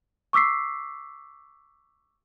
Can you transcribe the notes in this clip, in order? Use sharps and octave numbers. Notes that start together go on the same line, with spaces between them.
C#6 D6 E6 B6 C7